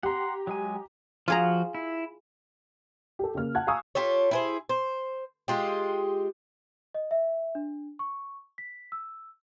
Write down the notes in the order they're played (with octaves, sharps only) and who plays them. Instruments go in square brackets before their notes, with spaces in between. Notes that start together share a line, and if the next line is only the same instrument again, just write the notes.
[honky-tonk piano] G4 A#5 [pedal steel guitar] F#5 C6
[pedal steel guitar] F#3 G#3 G#5
[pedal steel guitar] F3 F#4 [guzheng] F4 G#4 A#5
[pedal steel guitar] E4
[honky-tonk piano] G4 A4
C#3 A#3 F6
F#5 A5 F#6 G#6
F5 G#5 A#5 C#6 D#6 E6
[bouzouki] F4 G4 A4 C#5
E4 G#4 C5
C5
G#3 F4 G4
[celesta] D#5
E5
D4
C#6
B6
E6